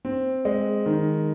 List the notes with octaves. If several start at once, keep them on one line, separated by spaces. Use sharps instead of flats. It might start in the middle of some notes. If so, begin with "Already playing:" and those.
C4
G#3
D#3